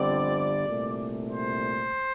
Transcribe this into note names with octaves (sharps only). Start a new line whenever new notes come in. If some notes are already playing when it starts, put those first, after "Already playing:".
Already playing: G1 F2 D3 G3 C4 D5
C2 A#2 A3
C5